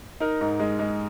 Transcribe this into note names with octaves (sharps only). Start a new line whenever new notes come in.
D#4 A#4
G#2
G#3
G#3